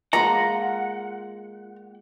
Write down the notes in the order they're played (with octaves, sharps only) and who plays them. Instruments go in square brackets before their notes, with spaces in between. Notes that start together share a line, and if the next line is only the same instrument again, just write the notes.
[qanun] G#3 A#3 F4 [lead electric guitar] F#5 [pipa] A#5